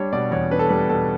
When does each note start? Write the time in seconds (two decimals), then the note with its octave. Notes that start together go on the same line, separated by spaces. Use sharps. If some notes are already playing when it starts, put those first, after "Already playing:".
Already playing: G3 D4 C#5
0.12 B2 D5
0.31 E2 C#5
0.51 D4 B4
0.59 A4
0.69 G3 B4
0.89 B2 A4